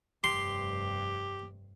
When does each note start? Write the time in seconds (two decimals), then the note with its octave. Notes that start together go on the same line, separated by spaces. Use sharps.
0.24 F1 G2 G4 C6